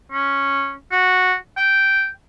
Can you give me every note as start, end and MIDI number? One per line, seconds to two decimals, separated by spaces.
0.12 0.73 61
0.91 1.34 66
1.57 2.07 79